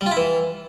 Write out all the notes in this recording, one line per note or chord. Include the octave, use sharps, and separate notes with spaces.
G3
F4
E4
E3